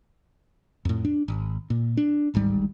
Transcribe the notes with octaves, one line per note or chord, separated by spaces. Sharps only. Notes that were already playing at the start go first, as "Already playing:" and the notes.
F2 A2
D4
G#1
A#2
D4
D1 G#1 G#2 G3